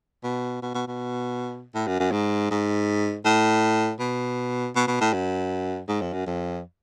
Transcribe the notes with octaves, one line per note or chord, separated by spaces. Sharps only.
B2
B2
B2
B2
A2
F#2
F#2
G#2
G#2
A2
B2
B2
B2
A2
F#2
G#2
F2
F#2
F2